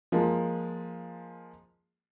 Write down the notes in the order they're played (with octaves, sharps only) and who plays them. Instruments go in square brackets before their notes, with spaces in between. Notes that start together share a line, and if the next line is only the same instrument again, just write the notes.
[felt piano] F3 G#3 A#3